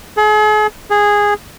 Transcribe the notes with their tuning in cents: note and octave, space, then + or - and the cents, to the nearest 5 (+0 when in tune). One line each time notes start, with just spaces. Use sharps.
G#4 +40
G#4 -10